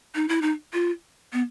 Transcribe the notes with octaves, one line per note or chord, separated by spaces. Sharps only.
D#4
E4
D#4
F4
B3